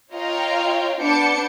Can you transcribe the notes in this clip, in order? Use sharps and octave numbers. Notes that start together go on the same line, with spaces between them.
F4 C#5 D#5 F5 G5 A#5
B3 D4 A5 D6 G6 C#7